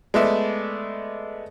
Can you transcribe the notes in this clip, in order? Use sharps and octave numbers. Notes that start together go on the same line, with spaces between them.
G#3 A3 B3 D5 E5